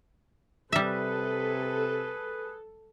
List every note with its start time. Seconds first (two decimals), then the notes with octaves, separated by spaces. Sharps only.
0.72 C3 G3 G#4 A4 B4 E5